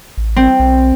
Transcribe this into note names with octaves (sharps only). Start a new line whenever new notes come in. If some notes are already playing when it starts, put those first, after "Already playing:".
A1
C4
B1